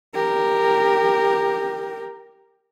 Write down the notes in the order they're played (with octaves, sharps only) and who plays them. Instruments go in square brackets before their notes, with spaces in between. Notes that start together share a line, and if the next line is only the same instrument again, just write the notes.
[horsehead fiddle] G4 A#4